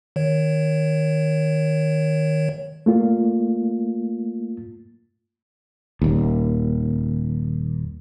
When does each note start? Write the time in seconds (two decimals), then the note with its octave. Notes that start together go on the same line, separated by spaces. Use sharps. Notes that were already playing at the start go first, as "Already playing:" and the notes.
0.16 D#3 C#5
2.86 A3 A#3 F4
6.02 D#1 D#2